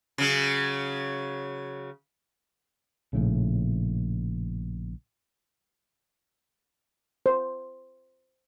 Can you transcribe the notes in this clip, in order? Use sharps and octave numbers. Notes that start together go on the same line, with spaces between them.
C#3 F#3
A#1 A2 C#3
C5